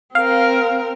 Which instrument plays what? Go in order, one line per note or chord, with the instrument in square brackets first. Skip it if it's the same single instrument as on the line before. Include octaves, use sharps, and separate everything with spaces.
[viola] C4 A#4 [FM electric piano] F5